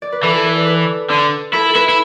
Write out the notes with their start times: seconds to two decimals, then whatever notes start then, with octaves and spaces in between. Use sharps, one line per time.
0.02 D5
0.12 B4
0.23 E3 A4
0.34 A4
0.45 B4
0.55 D5
0.67 B4
1.10 D3
1.54 E4 A4
1.69 A4
1.75 E4 B4
1.89 E4